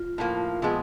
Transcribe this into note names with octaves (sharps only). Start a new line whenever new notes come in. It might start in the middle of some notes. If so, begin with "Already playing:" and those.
Already playing: F4
A2 F3 A#3
A#2 F3 G#3 B3